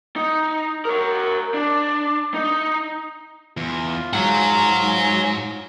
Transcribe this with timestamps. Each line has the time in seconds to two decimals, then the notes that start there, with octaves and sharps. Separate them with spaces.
0.16 D#4
0.85 A#4 C#5
1.54 D4
2.34 D#4
3.57 E2 F4
4.13 G#2 C#5 F#5